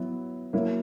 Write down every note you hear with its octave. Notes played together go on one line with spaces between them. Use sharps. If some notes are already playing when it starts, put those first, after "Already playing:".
Already playing: F#3 B3 E4
F#3 A#3 E4